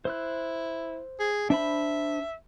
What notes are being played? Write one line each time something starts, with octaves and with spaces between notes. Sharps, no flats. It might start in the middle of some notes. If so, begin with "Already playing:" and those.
E4 C5 E6 F#6
G#4
D4 C5 E5 B5